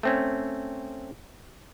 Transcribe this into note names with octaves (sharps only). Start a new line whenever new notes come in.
A3 C4 C#4